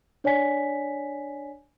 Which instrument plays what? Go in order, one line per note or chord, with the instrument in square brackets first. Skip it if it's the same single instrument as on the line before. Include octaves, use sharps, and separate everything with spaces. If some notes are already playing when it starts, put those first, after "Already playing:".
[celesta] D4 C#5 D5 G#5 B6